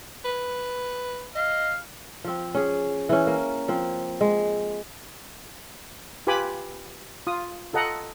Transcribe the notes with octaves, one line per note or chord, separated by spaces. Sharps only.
B4
D#5 F5
F3 C4
C#4 G#4
E3 C#4
A#3
F3 C4
G#3
F4 G4 B4 G#5 B5 D6
F4 D#6
F4 A4 D#5 F#5 A#5